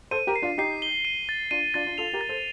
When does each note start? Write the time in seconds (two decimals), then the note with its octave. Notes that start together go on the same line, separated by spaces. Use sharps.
0.11 A4 C5 D#7
0.27 G4 A#4
0.36 C7
0.42 D4 F4
0.58 D#4 G4 C7
0.82 G7
1.05 D#7
1.29 A6
1.51 D4 F4 D#7
1.74 D4 F4 A6
1.86 D4 F4
1.98 F4 A4 F7
2.13 G4 A#4
2.21 A6
2.29 A4 C5